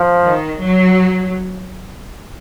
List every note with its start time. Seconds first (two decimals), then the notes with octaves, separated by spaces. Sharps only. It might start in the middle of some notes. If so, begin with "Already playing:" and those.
Already playing: F3
0.25 D#3
0.62 F#3